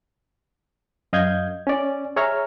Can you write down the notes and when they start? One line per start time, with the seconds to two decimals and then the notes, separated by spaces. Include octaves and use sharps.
1.13 F#2 D#5 F5 G6 G#6
1.67 C#4 D5
2.16 G#4 C#5 E5 A#5 F6